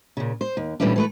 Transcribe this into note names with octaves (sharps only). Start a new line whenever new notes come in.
A#2 C#3
C5
D#2
A#2 E3 G3 A3 C#4 D4
E3 A3 B4